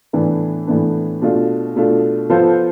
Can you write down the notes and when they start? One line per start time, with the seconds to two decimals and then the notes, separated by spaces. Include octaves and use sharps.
0.13 A2 E3 B3 D4
0.67 A2 E3 B3 D4
1.22 B2 A3 D4 F4
1.76 B2 A3 D4 F4
2.30 F3 B3 F4 A4 C5